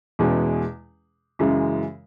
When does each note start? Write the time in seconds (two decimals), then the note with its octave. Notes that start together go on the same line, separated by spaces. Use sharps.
0.19 E2 B2 G#3 C#4
1.39 F#2 C#3 E3 G#3